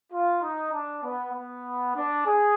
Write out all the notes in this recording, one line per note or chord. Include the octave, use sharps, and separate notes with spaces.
F4
D#4
D4
B3
B3
D4
G#4